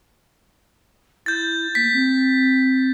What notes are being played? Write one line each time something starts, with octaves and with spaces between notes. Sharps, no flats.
E4 G6 A6
A#3 B6
C4